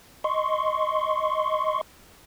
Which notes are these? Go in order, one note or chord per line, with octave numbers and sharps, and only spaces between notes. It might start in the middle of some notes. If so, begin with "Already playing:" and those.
D#5 C6 C#6